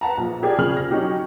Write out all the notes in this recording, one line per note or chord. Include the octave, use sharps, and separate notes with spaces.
B4 F#5 A5 A#5
A#1 F3
G4 G#4 A#4 D5 G5 G#5
C#3 F3 G#4 F6 F#7
A#6
F#3 C#4 D#4 G4